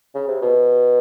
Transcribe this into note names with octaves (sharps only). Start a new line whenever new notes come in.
C#3
C3
B2